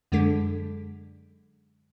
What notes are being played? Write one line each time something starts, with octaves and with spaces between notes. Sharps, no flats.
F#2 D3 G#3 D4 A4 B6